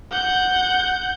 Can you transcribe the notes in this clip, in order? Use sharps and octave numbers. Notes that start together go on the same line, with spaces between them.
F#5 G6